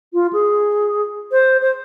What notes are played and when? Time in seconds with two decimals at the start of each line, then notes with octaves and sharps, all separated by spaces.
0.13 F4
0.33 G#4
1.32 C5
1.61 C5